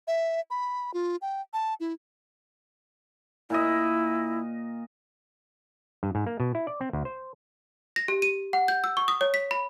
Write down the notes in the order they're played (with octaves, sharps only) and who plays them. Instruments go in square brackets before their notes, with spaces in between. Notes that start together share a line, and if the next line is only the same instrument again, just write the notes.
[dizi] E5
B5
F4
G5
A5
E4
[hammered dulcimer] A#2 D#5 [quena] E4
[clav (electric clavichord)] G2
G#2
A#3
B2
E4
D5
C4
D2
C5
[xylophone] A#6
G4
D#7
F#5
G6
E6
C#6
D#6
C#5
B6
B5